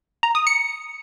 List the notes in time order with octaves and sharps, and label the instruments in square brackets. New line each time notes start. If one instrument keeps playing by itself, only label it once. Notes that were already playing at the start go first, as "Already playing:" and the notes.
[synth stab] A#5
D#6
C#7